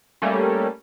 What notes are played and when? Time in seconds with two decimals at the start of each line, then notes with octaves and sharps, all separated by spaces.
0.22 G3 A3 A#3 C#4